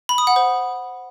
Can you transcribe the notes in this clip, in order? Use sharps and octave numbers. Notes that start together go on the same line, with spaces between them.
B5
D#6
F#5
C5